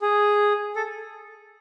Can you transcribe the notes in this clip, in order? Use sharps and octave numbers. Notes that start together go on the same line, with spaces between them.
G#4
A4